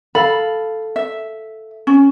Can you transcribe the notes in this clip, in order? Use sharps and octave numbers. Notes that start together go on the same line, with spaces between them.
A4 F5 B5
E5
C#4